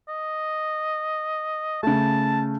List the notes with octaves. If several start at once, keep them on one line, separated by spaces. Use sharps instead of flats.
D#5
C#3 A3 A5